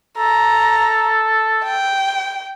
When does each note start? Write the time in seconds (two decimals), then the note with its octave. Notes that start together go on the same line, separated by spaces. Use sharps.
0.18 A4 A#5
1.64 G5